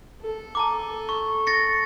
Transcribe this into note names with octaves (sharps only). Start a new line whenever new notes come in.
A4
A5 A#5 D6
C#6
A6 A#6 C#7